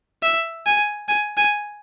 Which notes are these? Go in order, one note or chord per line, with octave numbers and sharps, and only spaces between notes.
E5
G#5
G#5
G#5